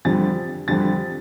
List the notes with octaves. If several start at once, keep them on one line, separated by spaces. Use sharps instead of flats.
F2 D3 G3 A6
F2 D3 G3 A6